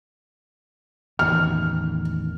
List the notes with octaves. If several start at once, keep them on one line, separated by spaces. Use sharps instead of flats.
A1 E2 D#3 F6